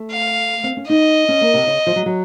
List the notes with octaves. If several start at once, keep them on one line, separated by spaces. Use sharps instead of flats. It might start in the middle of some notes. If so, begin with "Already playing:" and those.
Already playing: A3
F5
C4
C#4
D#4 D#5
C#4
A#3
C3
C#3
F3
F#3
F#3